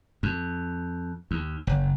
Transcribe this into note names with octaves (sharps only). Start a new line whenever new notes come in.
F2
D#2
F#1